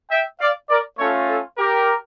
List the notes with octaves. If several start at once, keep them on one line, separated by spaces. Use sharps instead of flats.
E5 G5
D5 F5
A#4 D5
A3 C#4 F4 A4 C#5
A4
G4 A#4